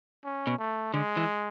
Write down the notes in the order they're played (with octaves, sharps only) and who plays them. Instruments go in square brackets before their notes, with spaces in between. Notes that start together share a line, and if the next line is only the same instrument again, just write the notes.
[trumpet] C#4
[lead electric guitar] B2
[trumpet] A3
[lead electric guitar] D3 [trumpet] G#3
[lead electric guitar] E3